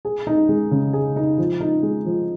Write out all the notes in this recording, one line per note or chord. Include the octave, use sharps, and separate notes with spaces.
G#4
D#4
G#3
C#3
G#4
D#4
F3
D#4
G#3
F3